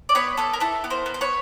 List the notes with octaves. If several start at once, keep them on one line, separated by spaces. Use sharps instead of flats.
D5
B3 B4 C#5
B3 A4 B4
A#4
E4 A4 B4
B3
A#4 C5
B3
C5
B4 C#5